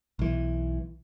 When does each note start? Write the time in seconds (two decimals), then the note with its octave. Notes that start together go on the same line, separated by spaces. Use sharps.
0.19 B1 E3